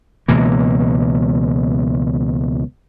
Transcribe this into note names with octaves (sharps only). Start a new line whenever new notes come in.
C#2 B2 E3 A#3